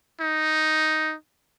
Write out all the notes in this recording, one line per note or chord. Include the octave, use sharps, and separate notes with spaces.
D#4